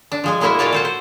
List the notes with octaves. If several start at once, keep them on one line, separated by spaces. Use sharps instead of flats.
D4
F3 G#3 G#5
B2 G#3 A#3 E4 F#4 E5
A#2 F4 F#4 C#5 D5
A4 C5 F#5
C5